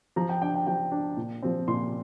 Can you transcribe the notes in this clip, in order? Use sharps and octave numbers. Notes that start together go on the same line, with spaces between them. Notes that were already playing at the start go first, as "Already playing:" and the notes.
F3 A#5
G5
D4 G5
G5
F3 G5
D4
A#2
F3 C4
A#2 C6